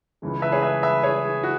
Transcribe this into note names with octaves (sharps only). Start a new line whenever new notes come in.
C#2 C#3 E3 G#3
B4 E5
G#4 C#5
B4 E5
B4 E5
G#4 C#5
G#4
F#4